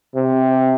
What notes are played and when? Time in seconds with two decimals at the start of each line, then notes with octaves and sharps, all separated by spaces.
0.15 C3